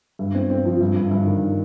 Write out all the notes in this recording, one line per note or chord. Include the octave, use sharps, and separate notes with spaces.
G2
C4
C4
F3
G2
G2
G2
D#3